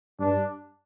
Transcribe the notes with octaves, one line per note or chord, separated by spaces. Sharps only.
G2 D4